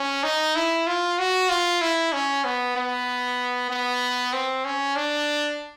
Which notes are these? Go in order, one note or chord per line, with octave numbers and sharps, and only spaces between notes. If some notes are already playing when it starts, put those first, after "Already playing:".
Already playing: C#4
D#4
E4
F4
F#4
F4
E4
C#4
B3
B3
B3
C4
C#4
D4